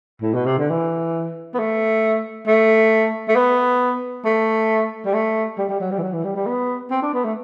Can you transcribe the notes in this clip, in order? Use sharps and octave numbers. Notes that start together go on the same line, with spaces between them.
A2
B2
C3
D3
E3
B3
A3
A3
A3
B3
A3
G3
A3
G3
G3
F#3
G3
E3
F#3
E3
G3
G3
B3
C4
D4
B3
A3